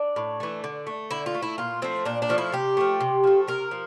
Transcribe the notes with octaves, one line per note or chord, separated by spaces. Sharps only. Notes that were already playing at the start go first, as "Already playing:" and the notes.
Already playing: D4
A2
E3 A3
D3
A3
D3 E4
F4
A3
E4
A#2 F4
F3 A3 C4
A#2 D4
D4
F3 A3
E4
C3 G4
F3 A3
C3
F3 A3
C3 A#4
F3